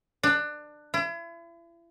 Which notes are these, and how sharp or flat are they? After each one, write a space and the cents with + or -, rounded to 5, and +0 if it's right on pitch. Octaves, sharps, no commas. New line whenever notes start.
D4 +20
E4 +40